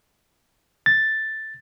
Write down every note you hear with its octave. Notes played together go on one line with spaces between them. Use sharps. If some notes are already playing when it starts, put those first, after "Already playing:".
A6